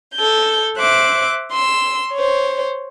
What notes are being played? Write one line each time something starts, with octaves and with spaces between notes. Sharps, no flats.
A4 G6
C5 E5 D6 F#6
C6 E6
C5 C#5